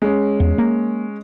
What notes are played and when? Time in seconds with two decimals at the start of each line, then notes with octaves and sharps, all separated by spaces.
0.02 G#3 C#4
0.40 E2
0.58 A#3